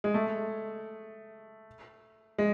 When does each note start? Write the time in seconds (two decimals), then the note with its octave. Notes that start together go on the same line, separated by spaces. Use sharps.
0.04 G#3
0.14 A3
2.38 G#3